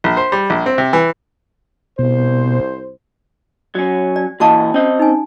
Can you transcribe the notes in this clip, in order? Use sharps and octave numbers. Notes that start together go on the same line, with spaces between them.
A#1
C5
G3
A#1
C4
C3
E3
C2 B2 C5
F#3 C#4
D5
A#2 E3 F#4 D#5 F5 A5
C4 C#4 D#5
D#4 G#5